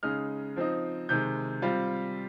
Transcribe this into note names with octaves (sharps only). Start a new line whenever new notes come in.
C#3 G#3 D#4 F6
F3 C4 D#4
C3 D#3 G#3 G6
G3 C4 F4